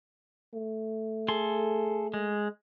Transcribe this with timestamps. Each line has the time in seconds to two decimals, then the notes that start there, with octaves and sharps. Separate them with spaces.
0.54 A3
1.28 G#4 A4 C6
2.14 G#3